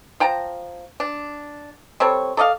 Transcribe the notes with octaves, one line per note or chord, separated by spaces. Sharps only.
F3 G5 A5 A#5
D4
G3 C4 A4 C#5
A4 D5 D#5 F5